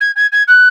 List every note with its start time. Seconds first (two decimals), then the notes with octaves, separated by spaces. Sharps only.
0.01 G#6
0.16 G#6
0.32 G#6
0.48 F#6